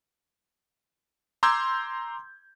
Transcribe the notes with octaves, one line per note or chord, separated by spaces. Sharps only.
A#5 C6 D6 E6 G6 G#6